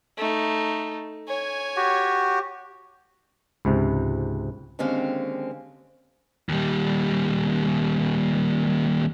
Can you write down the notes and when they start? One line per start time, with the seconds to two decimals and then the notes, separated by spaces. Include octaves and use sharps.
0.18 A3 D#4
1.28 C#5 G#5
1.76 F#4 G4
3.65 C#2 G#2 C3
4.79 D#2 D3 G#3 C4 C#4 F5
6.49 D#2 G3